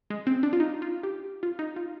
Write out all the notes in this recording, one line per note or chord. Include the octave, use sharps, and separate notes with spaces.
G#3
C4
D4
F4
D#4
F4
G4
F4
D#4
F4